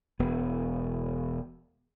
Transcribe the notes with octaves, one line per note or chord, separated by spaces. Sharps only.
E1 B3